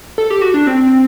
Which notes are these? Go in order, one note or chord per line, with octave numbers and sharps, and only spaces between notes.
A4
G4
F#4
D4
C4